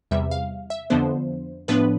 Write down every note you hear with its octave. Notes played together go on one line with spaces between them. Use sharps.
E2 C3 G3 E5
F5
E5
F2 D3 F3 B3 D4 C5
A2 F3 B3 D4 B4